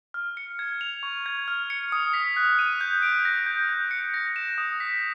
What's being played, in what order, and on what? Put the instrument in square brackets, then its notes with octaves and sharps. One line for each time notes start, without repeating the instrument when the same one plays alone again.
[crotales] F6
C#7
G#6
F7
C#6
G#6
F6
C#7
D#6
B6
F#6
D#7
G6
D7
A#6
G6
G6
C#7
A#6
E7
D#6
B6